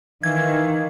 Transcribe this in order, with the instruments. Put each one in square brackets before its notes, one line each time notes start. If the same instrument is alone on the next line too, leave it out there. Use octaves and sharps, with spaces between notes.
[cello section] D#3 [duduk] E3 [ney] F5 [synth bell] G#6